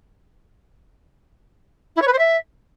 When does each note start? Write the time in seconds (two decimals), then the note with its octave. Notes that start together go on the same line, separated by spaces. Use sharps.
1.96 E4
2.01 C#5
2.07 B4
2.12 C5
2.18 E5